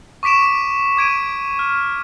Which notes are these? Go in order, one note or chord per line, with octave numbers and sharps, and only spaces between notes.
C#6 D6 B6 D7 E7
D6 G#6 D7 D#7
F6